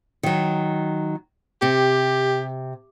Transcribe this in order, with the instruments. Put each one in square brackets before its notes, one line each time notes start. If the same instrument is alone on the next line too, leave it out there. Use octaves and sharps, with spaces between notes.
[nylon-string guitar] D#3 F#3
[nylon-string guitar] C3 [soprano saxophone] G4